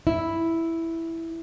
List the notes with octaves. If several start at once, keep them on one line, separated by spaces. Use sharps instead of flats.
E4